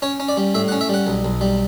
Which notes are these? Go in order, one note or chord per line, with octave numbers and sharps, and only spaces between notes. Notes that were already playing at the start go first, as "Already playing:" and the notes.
C#4 C#5
C#4
D5
G3
A2 E5
F#5
C#4
E5
G3 F#5
B1
B1
G3